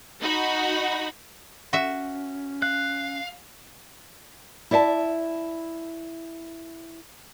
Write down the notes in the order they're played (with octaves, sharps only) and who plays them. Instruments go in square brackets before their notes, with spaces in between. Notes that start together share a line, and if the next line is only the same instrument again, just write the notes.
[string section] D#4 F#4 B5
[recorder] C#4 [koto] F#4 E5
[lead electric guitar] F5 [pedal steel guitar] F#6
[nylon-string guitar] E4 D5 E5 F#5 A5